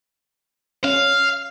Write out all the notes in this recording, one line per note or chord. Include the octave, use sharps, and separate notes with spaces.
C#4 F5